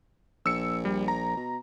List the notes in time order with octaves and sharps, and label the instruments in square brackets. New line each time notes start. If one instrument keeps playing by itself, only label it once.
[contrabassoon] A#1 [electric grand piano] E6 C#7
[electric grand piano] G3
A#5
[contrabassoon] B2